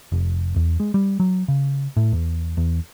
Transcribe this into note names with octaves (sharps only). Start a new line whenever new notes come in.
F1
E2
G#3
G3
F#3
C#3
A2
E2
E2